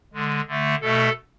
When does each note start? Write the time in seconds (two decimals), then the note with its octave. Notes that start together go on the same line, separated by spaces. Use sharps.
0.13 D3 G#3
0.48 D3 A3
0.81 B2 A3 A4